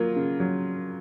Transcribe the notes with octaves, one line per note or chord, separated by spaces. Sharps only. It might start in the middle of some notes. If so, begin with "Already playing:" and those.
Already playing: F#3 A#3 F4
C#3
F#3